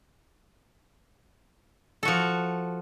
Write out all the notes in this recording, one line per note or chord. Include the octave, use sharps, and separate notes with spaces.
F3 F#4 A4